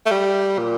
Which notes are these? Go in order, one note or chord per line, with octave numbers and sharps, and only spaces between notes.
A3
G3
A#2